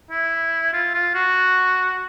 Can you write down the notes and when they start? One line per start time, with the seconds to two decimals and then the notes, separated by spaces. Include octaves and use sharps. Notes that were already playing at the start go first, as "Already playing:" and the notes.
0.11 E4
0.73 F4
0.94 F4
1.15 F#4